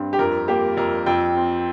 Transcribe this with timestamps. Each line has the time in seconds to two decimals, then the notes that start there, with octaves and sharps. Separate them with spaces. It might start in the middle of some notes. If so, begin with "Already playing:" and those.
Already playing: G2 C4
0.13 G4
0.19 F2 A#4
0.48 A#3 G4
0.77 F2 A#4
1.06 F2 G5
1.36 C4